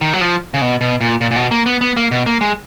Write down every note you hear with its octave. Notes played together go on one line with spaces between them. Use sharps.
D#3
F#3
F3
C#3
B2
B2
A#2
A#2
A#2
B2
A#3
B3
B3
A#3
B2
A#3
G#3